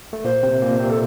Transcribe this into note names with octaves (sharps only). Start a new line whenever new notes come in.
A3
A#2 A#3 C5
C3 C4
A#2 A#3
C3 C4
A4